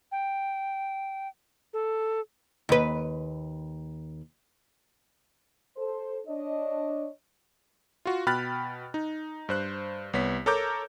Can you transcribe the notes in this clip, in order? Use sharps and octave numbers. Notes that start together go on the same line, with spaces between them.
G5
A4
D#2 B4
A4 C5
D4 C#5 D#5
F4 F#4
B2 G5 B5 F6 F#6 A6
D#4
G2 C5 F#6
C2 B3 C#5 B6
A4 A#4 C#5 A#5 D6 G6